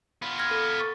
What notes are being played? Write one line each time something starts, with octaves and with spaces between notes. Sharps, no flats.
B3 F4 B5
F6 G#6 A#6
A4
C#6 D6 A6